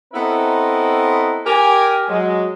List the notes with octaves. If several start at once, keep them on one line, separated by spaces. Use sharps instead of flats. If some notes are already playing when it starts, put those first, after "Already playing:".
B3 C4 E4 A4 A#4 D#5
G4 A#4 G#5
F#3 G#3